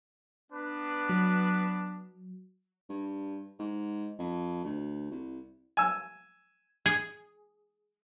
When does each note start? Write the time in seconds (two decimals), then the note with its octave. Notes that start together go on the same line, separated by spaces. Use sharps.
0.52 B3 D4 B4
1.09 F#3
2.89 G2
3.59 G#2
4.19 F2
4.64 D2
5.11 C2
5.77 G#5 E6
6.86 G#4